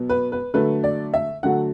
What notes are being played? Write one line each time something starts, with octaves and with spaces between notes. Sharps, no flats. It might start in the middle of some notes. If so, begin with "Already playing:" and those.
Already playing: B2 F#3 B3
B4
B4
D3 F#3 A3 B4
D5
E5
D3 F#3 A3 F#5